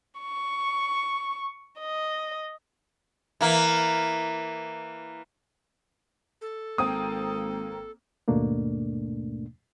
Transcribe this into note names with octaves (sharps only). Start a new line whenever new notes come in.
C#6
D#5
E3 A#3
A4
G#1 A#3 C4 G5 D#6
D#2 G#2 B2 A3 A#3 D4